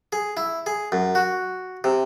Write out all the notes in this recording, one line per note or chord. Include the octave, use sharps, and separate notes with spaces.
G#4
E4
G#4
F#2
F#4
C3